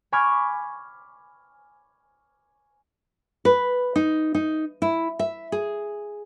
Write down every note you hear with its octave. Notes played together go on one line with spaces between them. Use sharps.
G#5 B5 C#6 D6 F6 G#6
B4
D#4
D#4
E4
E5
G#4